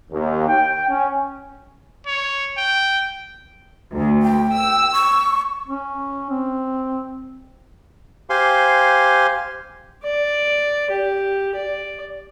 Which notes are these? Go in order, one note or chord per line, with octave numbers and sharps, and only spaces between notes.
D#2
G5
C#4
C#5
G5
D2
G5
E6
C#6
C#4
C4
G4 C5 F5 G#5 C6
D5
G4
D5